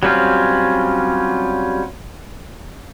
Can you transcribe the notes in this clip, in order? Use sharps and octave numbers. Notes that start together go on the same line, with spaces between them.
F#3 G3 C4 C#4 F4